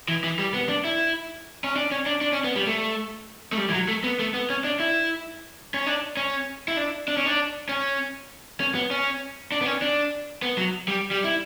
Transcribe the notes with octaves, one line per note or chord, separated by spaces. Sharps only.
E3
E3
G3
B3
D4
E4
C#4
D4
C#4
D4
D4
C#4
B3
G3
A3
A3
G3
E3
F#3
A3
B3
A3
B3
C#4
D4
E4
C#4
D4
C#4
E4
D4
D4
C#4
D4
C#4
C#4
B3
C#4
D4
B3
C#4
D4
B3
F#3
G3
G3
E4